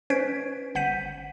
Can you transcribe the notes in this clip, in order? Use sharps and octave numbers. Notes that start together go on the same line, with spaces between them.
C#4 B4 C5 G#6 B6 D7
G1 F#5 G6 B6 D#7